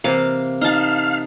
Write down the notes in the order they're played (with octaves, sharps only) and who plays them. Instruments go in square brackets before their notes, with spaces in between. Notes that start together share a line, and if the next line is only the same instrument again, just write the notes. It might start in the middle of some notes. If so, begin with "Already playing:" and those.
[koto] C3 E3 A#3 [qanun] F5
[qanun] D#4 A5 [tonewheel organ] F5